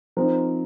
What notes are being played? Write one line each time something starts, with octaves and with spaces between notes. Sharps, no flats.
F3 C4 D#4 A#4